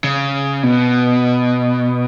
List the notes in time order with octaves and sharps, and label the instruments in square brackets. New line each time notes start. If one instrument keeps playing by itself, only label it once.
[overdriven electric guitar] C#3
B2